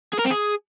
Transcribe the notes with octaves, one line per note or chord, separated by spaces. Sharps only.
G#4
A#4
C4
G#4